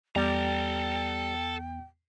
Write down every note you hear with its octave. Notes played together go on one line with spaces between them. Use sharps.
E2 G3 B3 A4 G5 A#5 A6